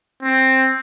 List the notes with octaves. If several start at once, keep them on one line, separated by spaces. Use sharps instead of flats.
C4